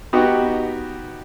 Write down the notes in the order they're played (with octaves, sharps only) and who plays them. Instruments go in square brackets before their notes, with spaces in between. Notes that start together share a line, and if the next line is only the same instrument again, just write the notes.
[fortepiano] B3 D#4 F#4 G4 B4